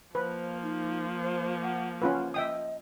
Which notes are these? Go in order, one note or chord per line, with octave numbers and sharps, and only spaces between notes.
F3 A#3 B4 C5
D#4
C5
F#5
C#4 F4 B4 F#5
D#5 E5 G5 D#6